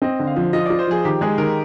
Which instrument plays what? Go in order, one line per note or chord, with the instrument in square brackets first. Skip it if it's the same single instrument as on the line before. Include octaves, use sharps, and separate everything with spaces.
[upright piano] C4 [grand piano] D#5
[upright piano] D3
[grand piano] F5
[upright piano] F3
[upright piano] F4 [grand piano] D#5
[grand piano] D5
[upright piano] F4
[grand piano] C5
[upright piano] F3 [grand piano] G#4
[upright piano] D#3 [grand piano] G4
[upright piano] G#3 [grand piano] G#4
[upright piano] D#3 [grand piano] A#4